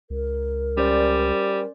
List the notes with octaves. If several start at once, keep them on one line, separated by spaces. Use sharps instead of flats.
C#2 A#4
G3 C#4 C5 D5